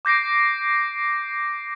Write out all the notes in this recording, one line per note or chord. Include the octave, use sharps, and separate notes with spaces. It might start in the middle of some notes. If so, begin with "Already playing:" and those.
D6 G6 A#6 C7 D7